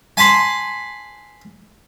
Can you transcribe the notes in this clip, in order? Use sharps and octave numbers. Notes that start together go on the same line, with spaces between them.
G#5 A5 B5 C6